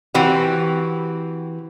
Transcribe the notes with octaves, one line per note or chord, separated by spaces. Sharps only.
E3 C4 F#4 G4